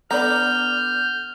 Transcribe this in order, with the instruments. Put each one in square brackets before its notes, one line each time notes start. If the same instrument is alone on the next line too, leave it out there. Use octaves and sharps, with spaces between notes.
[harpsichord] B3 D4 A4 [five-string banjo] D5 A#5 [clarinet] F6 [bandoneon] G6